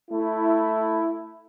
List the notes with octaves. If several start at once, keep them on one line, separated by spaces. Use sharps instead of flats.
A3 E4